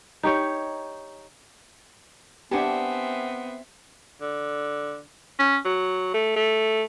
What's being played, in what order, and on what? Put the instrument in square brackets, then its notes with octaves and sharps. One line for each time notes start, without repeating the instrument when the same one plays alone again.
[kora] D#4 G4 C#5
[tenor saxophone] B3 [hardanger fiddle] C4 E5 [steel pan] D4 G4 [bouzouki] F#5 G#5 A5
[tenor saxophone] D3
C#4
F#3
A3
A3